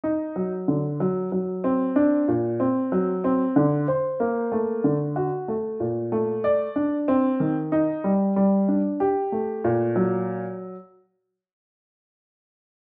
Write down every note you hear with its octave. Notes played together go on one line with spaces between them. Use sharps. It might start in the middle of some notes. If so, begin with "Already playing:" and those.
D#4
F#3
D3
F#3
F#3
C4
D4
A#2
C4
F#3
C4
D3
C5
A#3
A3
D3
F#4
A3
A#2
A3
D5
D4
C4
D#3
D#4
G3
G3
D4
G4
A3
A#2
F#3